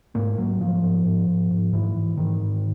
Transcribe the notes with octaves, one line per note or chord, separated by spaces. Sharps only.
G#2 A#3
G#2 F#3
G#2 F3
G#2
G#2
G#2
G#2
G#2 E3
G#2
G#2 D#3
G#2